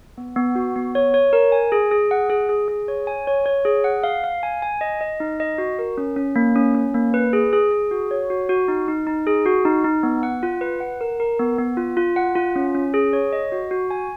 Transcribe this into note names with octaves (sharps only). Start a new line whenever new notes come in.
B3
B3
F#4
B3
C#5
C#5
A#4
G#5
G#4
G#4
F#5
G#4
G#4
G#4
C#5
G#5
C#5
C#5
G#4
F#5
F5
F5
G#5
G#5
D#5
D#5
D#4
D#5
F#4
A#4
C#4
C#4
A#3
C#4
C#4
A#3
B4
G#4
G#4
G#4
F#4
C#5
F#4
F#4
D#4
D#4
D#4
G#4
F#4
D#4
D#4
B3
F#5
F4
B4
F#5
A#4
A#4
B3
B3
F4
F4
F#5
F4
C#4
C#4
G#4
C#5
D#5
F#4
F#4
G#5